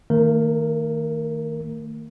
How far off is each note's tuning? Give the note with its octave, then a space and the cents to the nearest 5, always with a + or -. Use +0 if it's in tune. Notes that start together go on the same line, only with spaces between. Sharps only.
D#3 +5 A3 +45 A#4 +0